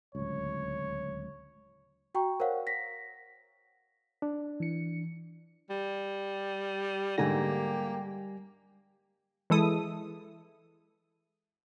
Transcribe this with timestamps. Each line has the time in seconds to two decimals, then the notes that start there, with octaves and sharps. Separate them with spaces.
0.15 D1 C#2 C#5
2.15 F#4 G5 A#5 C#6
2.40 A#4 C5 C#5 F5 F#5
2.67 A#6 B6
4.22 D4
4.60 E3 C#7
5.70 G3
7.18 G#2 D3 G3 A3 A#3 G4 G#5 A#6
9.50 E3 G#3 E4 A4 D#6